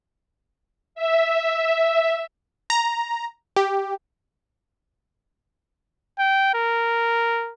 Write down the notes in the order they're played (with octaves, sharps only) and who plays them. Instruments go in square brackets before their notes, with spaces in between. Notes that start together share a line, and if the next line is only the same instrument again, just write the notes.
[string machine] E5
[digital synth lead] A#5
G4
[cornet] G5
A#4